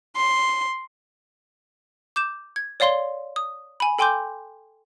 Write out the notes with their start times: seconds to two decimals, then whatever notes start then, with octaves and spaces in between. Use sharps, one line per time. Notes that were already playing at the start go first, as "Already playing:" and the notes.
0.16 C6
2.16 D6 G6 E7
2.56 G#6
2.80 C#5 D5 F5 C6 G7
3.36 D#6
3.80 G#5 B5
3.99 A4 G5 G#5 C6 D6 G6